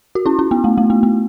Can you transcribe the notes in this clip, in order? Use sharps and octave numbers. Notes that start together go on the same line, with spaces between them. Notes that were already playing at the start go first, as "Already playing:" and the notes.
F#4
C#4 E4
C#4
B3
A3
A3
B3
B3